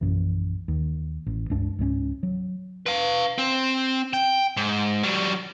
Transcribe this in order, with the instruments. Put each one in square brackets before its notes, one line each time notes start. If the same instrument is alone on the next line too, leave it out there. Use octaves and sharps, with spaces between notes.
[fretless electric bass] A#1 F#2 E3
D#2
A1
C#2 G2 D4
C#2 G#2 G#3 C#4
F#3
[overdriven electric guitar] B4 F5
C4
G5
G#2
F#3 G3